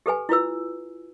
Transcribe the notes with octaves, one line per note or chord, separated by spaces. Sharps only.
G4 A4 B4 G#5
E4 F4 B4 E6